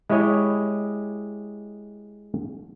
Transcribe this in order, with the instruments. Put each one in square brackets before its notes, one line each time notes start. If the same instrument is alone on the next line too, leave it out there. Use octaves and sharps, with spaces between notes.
[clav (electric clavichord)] G#3 E4 G4 C#5 D#5